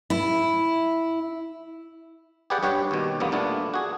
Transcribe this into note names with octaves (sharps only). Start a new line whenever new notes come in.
E4
G4 G#4 B4 D5 F#5 G5
G2 G4 C#5 F#5
D#2 B2
E2 G2 A#3 B3
A#2 A3 B3 D4 D5
F#4 G#4